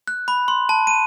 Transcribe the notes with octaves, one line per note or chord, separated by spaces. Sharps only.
F#6
B5
C6
A5
D#7